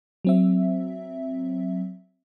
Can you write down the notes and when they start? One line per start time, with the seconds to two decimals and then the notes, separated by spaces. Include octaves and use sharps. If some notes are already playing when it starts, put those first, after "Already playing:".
0.25 F#3 C4 E5